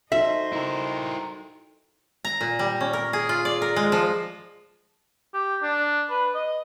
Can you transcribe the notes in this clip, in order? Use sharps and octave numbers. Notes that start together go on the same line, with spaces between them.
D#4 F#4 A4 C5 D#5 E5
E4 A#4
A#5
A#2
G3
C#4
A#4
G#4
F4
D5
A#4
G#3
F3
G4
D4
B4
D#5